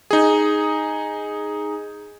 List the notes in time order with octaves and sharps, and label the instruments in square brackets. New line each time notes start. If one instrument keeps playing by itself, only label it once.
[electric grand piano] D#4 G#4